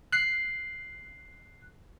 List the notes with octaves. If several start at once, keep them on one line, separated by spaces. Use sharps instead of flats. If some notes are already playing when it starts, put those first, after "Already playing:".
F#6 C7